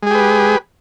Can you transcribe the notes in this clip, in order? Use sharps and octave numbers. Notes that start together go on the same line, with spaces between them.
G#3 G4 G#4 B4